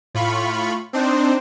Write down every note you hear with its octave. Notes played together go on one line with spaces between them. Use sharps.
A2 F4 B5 C#6
C4 D4 D#4 C5